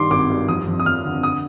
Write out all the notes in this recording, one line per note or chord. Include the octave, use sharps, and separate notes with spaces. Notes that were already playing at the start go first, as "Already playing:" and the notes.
Already playing: G2 D#3 C6 D6
G#1 D6
G2
F2 D#6
F2
D#6
F2 F6
D3
D#6